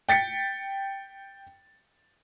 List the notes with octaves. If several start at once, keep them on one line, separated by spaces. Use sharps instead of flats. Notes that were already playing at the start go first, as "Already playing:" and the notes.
G5 A6 B6 C#7